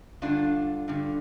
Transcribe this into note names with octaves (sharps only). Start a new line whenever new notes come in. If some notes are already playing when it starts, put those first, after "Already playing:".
G2 D3 D4 F4
G2 D3